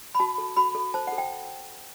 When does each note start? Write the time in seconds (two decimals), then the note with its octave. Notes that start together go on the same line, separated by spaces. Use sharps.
0.15 B5
0.19 F#4 A5
0.38 A4
0.57 F#4 B5
0.75 A4
0.94 C5 A5
1.07 F#5
1.12 A4
1.18 G5